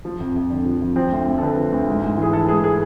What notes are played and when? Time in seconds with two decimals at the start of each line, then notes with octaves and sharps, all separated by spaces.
0.05 F3
0.20 F2
0.35 F2
0.50 D3
0.66 F3
0.81 F2
0.96 F3 C4
1.12 D2
1.27 D2
1.38 A4
1.42 D3 B4
1.57 F3
1.72 D2
1.88 G#2
2.02 G#2
2.18 E3 G#4
2.33 E3 A4
2.48 G#2 G#4
2.64 G#4